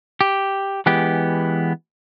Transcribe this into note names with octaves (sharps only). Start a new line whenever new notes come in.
G4
E3 G#3 B3 G4